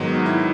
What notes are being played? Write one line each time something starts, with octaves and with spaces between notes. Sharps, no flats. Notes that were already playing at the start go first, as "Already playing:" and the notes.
Already playing: G#2 D#3 F#3 B3
E4